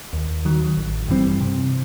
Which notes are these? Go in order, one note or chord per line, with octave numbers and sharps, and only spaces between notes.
D#2
D#3 F#3
A1
G2 E3 G3 C4
C3